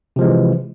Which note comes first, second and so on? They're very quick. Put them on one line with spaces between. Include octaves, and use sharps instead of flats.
C3 F3 G#3 E3